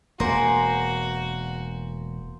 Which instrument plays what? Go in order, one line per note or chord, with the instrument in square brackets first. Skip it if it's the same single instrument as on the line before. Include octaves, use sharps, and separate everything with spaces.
[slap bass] E1 [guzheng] A#3 [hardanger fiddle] F#4 [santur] C5 G#5